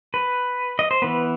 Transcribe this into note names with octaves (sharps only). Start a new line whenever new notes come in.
B4
D#5
C5
E3 B3 B4